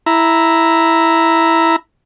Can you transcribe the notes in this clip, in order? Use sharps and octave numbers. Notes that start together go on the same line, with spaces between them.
E4 A#5